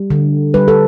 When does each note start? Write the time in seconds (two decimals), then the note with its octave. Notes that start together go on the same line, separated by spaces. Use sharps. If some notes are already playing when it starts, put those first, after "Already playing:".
Already playing: G3
0.10 D3
0.54 G3 B4
0.68 A4